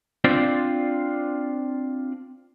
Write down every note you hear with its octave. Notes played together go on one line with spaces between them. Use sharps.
C4 D4 F4 C5 D5